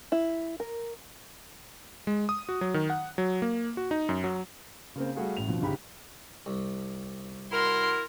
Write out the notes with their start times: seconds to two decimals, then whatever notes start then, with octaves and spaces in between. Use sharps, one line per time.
0.12 E4
0.60 A#4
2.07 G#3
2.29 D#6
2.49 F#4
2.61 F#3
2.74 D#3
2.90 F#5
3.18 F#3
3.42 A#3
3.77 F#4
3.91 D#4
4.09 F#2
4.24 F#3
4.96 C#3 A#3 C4
5.15 G3 A3 F#4 G#4 F5
5.37 A1 A2 F7
5.48 F2 B2 D3 F3
5.62 G1 C#2 G#2 G4 B5
6.46 C2
7.52 E4 F#4 A#4 C6